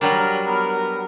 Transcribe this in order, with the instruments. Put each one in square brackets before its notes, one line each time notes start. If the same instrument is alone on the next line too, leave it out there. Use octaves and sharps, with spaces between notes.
[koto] F#3 G3 D4 [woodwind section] A#4
[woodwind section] B3 A#4